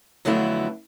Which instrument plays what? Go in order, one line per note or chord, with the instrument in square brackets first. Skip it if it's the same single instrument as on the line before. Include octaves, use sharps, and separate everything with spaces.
[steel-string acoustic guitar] F2 D3 F#3 A3 B3 E4